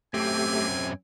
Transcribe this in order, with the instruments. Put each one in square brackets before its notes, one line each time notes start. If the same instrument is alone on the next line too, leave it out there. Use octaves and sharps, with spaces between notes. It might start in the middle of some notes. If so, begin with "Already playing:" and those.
[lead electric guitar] F#2 C4 [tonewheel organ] A3 G4 [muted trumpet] G#5